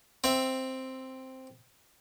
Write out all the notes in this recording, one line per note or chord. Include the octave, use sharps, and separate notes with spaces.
C4 E5